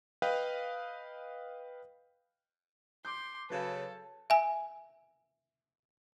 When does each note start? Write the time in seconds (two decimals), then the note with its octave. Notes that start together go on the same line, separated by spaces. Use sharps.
0.22 B4 D#5 F5 G5
3.05 C6 D6 G6
3.50 C#3 F#3 A4 B4 F5
4.30 E5 G#5